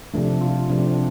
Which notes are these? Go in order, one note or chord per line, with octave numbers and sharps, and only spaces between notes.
C3 F3 A3 D4
F4
C3 F3 A3 D4
C4
D4